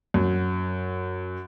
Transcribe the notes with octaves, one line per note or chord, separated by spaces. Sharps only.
F#2